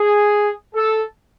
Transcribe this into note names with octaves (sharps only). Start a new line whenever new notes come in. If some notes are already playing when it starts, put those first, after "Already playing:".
Already playing: G#4
A4